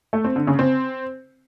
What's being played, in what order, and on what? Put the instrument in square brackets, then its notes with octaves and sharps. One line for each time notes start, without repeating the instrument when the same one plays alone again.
[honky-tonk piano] A3
C4
D3
C#3
C4